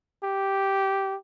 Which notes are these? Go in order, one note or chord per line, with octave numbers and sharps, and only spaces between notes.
G4